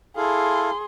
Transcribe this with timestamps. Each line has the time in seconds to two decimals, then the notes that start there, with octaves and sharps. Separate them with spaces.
0.17 E4 G#4 A4 F5 C6